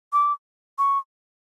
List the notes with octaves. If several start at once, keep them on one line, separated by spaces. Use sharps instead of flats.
D6
C#6